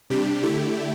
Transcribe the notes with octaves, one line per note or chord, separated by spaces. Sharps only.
C3 G3 D4 G4
D3 A3 E4 G4